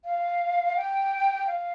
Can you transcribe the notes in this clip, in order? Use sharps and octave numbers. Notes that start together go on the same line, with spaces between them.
F5
G5
F5